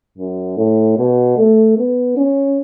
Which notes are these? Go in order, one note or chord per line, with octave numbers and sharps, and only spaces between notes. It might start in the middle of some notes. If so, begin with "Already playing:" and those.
F#2
A2
B2
A3
B3
C#4